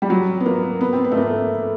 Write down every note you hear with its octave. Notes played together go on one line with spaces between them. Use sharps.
G3
F#3
B3
A#3
B3
C4
B3
A3
A#3